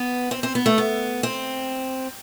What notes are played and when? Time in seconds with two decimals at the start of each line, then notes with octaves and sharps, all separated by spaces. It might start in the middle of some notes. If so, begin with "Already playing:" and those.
Already playing: B3
0.31 C4
0.43 C4
0.55 B3
0.66 A3
0.78 B3
1.23 C4